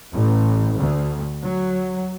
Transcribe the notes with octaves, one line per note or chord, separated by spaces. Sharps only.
A1
D2
F#3